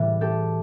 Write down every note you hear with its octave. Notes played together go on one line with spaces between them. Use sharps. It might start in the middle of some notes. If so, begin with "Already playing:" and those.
Already playing: A2 E3 G3
G4 A4